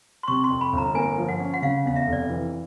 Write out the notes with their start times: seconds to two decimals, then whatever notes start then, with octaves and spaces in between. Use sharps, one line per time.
0.23 C6
0.28 C3 C#6
0.44 C6
0.50 F2
0.61 B5
0.73 G1
0.78 A#5
0.95 A#3 G#5
1.18 F3
1.28 F#5
1.40 C#4
1.54 F#5
1.62 C#3 F5
1.85 E2 F5
1.96 E5
2.07 F1
2.13 D5
2.30 E3